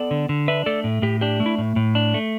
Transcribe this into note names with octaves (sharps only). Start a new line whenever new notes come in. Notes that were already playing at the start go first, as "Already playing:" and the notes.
Already playing: B3 A4 D5
D3
D3
D4 B4 E5
A3 A4 D5
A2
A2 G4
D4 G4
A3
E4
A2
A2
D4
A3